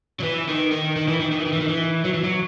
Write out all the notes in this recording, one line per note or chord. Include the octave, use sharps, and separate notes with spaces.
F#3
E3
D#3
D#3
D#3
E3
D#3
D#3
E3
D#3
E3
D#3
E3
F#3
E3
F#3